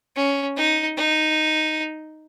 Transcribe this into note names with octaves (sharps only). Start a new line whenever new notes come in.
C#4
D#4
D#4